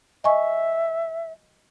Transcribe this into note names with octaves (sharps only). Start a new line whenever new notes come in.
D#5 E5 G#5 C#6